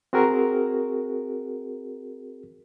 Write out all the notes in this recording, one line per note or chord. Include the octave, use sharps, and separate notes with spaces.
C4 F#4 G#4 A#4